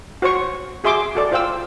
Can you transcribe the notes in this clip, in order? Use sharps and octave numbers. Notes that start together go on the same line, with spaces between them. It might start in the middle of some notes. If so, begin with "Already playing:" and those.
F#4 C5 C#5 C#6
F#4 G#4 E5 C6 D6
F#4 A4 D5
F4 C5 F5 G5 E6